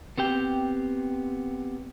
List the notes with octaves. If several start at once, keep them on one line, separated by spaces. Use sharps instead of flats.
B3 C4 G4 G5